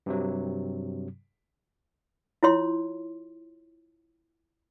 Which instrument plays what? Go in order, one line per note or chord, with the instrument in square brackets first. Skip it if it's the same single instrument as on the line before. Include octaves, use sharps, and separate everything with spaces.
[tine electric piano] G2 C3 F#3
[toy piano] E4 F4 C#5 C6